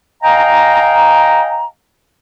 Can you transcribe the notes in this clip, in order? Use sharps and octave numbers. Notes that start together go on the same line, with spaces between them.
D#5 F5 G5 G#5 A#5